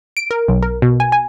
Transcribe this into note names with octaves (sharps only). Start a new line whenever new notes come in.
D7
A#4
B1
A#4
B2
G#5
G#5